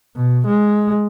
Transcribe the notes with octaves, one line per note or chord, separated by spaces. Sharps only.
B2
G#3